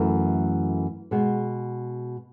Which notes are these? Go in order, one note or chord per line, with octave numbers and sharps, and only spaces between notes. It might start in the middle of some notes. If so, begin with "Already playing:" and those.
Already playing: F#2 E3 A3
B2 G#3 B3